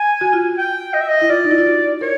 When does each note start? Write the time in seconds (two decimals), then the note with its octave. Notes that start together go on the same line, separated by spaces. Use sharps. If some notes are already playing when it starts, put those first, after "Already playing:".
Already playing: G#5
0.21 F#4
0.33 F4
0.58 G5
0.94 D#5
1.01 E5
1.09 D#5
1.21 E4
1.29 F4 D5
1.45 D#4
1.51 E4
1.58 F4
1.66 F#4
2.01 A#4 C#5